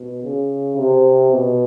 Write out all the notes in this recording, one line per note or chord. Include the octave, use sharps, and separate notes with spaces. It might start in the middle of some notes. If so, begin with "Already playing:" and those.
Already playing: B2
C#3
C3
B2